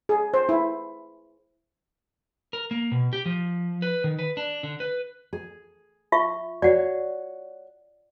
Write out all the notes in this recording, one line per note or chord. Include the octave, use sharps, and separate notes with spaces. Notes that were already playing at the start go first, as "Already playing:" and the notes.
G#4
C5
E4
A#4
A#3
B2
G4
F3
B4
D#3
B4
D4
D3
B4
G#4
F4 E5 C#6
F#4 C#5 D5 F#5